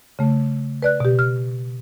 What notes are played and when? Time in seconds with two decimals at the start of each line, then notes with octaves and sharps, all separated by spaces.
0.19 C#3 A3
0.82 B4 D5 F#6
1.00 B2 G4
1.19 F6